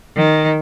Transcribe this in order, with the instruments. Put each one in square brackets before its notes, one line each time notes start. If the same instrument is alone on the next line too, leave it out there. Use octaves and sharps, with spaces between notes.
[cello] D#3